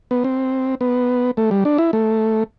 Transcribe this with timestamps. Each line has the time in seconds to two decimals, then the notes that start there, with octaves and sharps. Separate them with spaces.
0.11 B3
0.24 C4
0.81 B3
1.37 A3
1.51 G3
1.65 D4
1.78 E4
1.93 A3